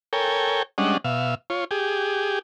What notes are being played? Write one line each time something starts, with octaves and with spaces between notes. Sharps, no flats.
A4 A#4 C#5 G5 G#5
G3 G#3 C#4 D4 D#5 F#5
B2 E5 F5
F4 C#5
G4 G#4